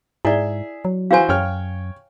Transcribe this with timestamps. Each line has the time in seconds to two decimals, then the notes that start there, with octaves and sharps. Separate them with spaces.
0.25 G#2 E4 G#4 D5 E5
0.85 F#3
1.11 E3 F#4 C5 F5 G#5
1.29 F#2 C#5 G5 F6